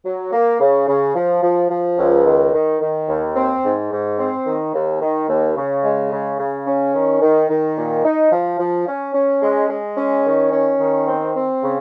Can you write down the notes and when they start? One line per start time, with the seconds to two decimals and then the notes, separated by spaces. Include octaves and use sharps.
0.05 F#3
0.33 A#3
0.60 C#3
0.88 C#3
1.15 F3
1.43 F3
1.70 F3
1.98 C#2
2.26 D#3
2.53 D#3
2.81 D#3
3.08 D#2
3.36 C4
3.63 G#2
3.91 G#2
4.19 C4
4.46 D#3
4.74 D#2
5.01 D#3
5.29 D#2
5.56 C#3
5.84 G#3
6.12 C#3
6.39 C#3
6.66 C#4
6.94 D#3
7.22 D#3
7.49 D#3
7.77 A#2
8.05 D#4
8.32 F3
8.59 F3
8.87 C#4
9.15 C#4
9.42 G#3
9.70 G#3
9.97 C#4
10.25 D#3
10.52 C#4
10.80 D#3
11.08 C4
11.35 C4
11.63 C#3